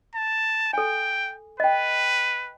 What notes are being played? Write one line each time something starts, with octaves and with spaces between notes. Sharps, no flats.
A5
A4 G5 G#5
B4 D#5 G5